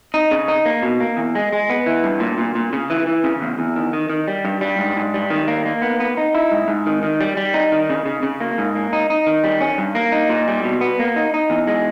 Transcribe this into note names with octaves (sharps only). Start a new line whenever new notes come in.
D#4
C#3
D#4
A#3
B2
A#3
E2
G#3
G#3
B3
E3
G2
A#2
A#2
A#2
C#3
E3
E3
C#3
E2
E2
D#3
D#3
D#3
G3
G2
G3
G#2
G#2
G3
D#3
A#3
A#3
B3
B3
D#4
E4
G#2
G#2
D#3
D#3
G3
G3
D#4
D#3
C#3
C#3
C#3
A#3
G#2
A#3
D#4
D#4
D#3
G3
C#4
G2
A#3
D#4
A#2
G3
B2
B3
A#3
D#4
D#4
E2
G#3